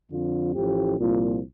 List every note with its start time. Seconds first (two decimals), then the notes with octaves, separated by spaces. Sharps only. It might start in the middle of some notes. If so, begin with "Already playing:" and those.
0.11 F2 D3 F3 F4
0.55 A1 A2 F3 G4
0.98 C2 A#2 F3 F4